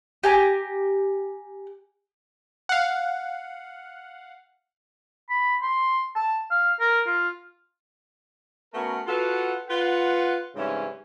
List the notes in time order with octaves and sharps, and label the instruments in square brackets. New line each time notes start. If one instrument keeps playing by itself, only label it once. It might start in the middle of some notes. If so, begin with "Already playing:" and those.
[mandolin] G4 G#5 A#5
[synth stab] F5 F#5
[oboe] B5
C6
A5
F5
A#4
F4
[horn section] A3 B3 C#4 F#4 A#4
F4 F#4 A4 B4 F5 F#5
F4 B4 F#5
G#2 C#3 E3 G3 C4 C#4